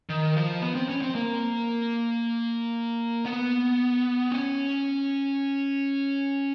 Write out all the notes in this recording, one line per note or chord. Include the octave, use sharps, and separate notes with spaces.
D#3
F3
B3
C4
C#4
C4
A#3
B3
C#4